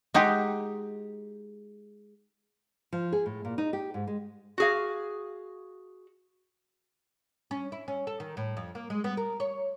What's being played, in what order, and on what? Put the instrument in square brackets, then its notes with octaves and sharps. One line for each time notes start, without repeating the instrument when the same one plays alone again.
[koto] G#3 D#4 F#4 G4
[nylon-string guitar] F3
G#4
A2
A#2
D#4
G4
G#2
G#3
[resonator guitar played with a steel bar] F#4 G#4 F5
[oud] C#4
E4
C#4
A4
D#3
A2
F2
A#3
G#3
B3
A#4
C#5